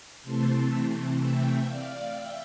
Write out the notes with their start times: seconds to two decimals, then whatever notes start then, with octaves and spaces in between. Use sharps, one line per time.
0.23 C3 E3 A3 C4 A5 C6
1.17 E5 G5
1.64 D5 F5
2.12 E5 G5